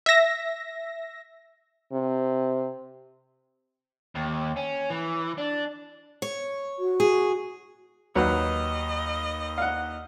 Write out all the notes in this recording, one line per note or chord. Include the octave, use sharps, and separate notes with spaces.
E5 A#6
C3
D#2
C#4
E3
D4
C#5
F#4
G#4
D#2 F#3 B4 D#5 F#5
F5 F#5